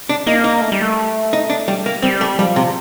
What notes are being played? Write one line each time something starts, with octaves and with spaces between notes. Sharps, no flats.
D4
A#3 D#4
D#4
A3
G3
A3
D#4
D4
G3
A#3
G3 C4
A3
F3 G3
C3